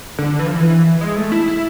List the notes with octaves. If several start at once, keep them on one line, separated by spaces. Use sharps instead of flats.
D3
E3
F3
E3
G#3
A3
E4
E4